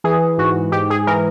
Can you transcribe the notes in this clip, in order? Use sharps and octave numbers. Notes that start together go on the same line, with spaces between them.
E3 G#4
G#2 F#4
G#2 G4
G#4
E3 A#4